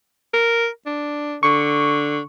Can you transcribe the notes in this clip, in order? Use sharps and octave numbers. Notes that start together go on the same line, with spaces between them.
A#4
D4
D3 C#6